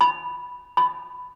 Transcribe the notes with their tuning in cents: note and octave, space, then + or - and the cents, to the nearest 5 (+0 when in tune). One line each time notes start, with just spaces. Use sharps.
B5 -5
B5 +10